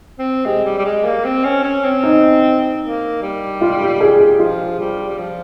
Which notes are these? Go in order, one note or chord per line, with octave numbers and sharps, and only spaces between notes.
C4
G#3 G4
G3
G3
G#3
A#3
C4
C#4
C#4
C4
D#4
A#3
G3
F4
G4
G#4
G4
F3 F4
G3
G3
F3